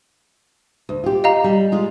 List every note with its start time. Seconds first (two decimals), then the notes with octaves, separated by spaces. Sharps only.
0.89 D2
1.04 F4 G4
1.24 D#5 F5 A#5
1.44 G3
1.72 G#3 F4